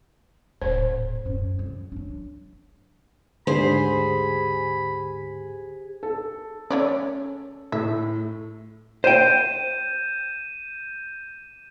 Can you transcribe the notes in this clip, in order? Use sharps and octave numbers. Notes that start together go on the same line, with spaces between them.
D#1 A2 C5
F#2 C#4
F#2
F#3 D4
D2 G#2 D3 G4 G#4 C5 B5
A4
A3 C#4 C#5 D5
A2 E5
C5 G5 G6 D#7 E7